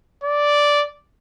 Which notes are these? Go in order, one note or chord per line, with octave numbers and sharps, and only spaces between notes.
D5